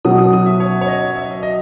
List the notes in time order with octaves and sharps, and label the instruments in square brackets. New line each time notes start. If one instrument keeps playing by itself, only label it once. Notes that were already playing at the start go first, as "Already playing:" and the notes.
[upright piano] B2 F#3 C#4 [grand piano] D#6
[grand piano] D#6
D#6
E5
C#5
C#5
D#5
E5
D#5